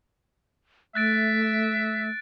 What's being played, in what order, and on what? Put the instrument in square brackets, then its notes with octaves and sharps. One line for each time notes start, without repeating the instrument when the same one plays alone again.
[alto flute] A3 [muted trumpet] E5 [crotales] F#6 A6 D7